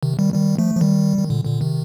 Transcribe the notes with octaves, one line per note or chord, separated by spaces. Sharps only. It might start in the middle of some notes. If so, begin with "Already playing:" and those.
C3 D#3
D#3 G3
D#3 G3
F3 A3
F3
D#3 G3
D#3
A#2 D3
A#2 D3
C3 D#3